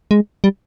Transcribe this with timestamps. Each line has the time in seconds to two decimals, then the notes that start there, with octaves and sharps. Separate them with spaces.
0.11 G#3
0.44 G3